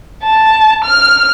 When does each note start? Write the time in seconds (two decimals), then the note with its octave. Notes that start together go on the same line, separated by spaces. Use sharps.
0.24 A5
0.85 F6